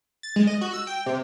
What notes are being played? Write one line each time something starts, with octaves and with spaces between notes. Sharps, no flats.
A6
G#3
D#5
F#4
E6
G5
C3